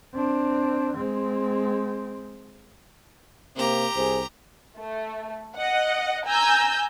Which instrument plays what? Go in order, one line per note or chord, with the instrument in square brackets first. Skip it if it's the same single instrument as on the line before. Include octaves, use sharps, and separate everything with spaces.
[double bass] C4 D4
G#3 C4
[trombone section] C3 A#3 C4 [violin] G4 A#5
[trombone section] C2 G#4 C5
[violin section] A3
D#5 F#5
G#5 A#5 E6 G6